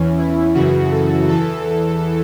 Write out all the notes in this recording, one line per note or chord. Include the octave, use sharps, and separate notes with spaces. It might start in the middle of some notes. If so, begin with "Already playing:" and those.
Already playing: E2 E3 C#4
E4
F#2 C#3 E3 F#4
A4
E2 E3 A4